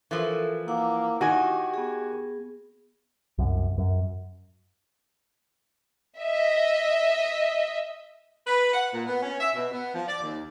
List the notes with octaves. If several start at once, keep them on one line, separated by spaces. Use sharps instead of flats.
E3 F3 A4 A#4 C5
A#3 E4 F#5 D6
D#3 F#4 G4 G#5
B3 G#4
C2 F#2
F#2
D#5 E5
B4
F#5
A#2
B3
C#4
E5
B2
B3
F3
D5
D#2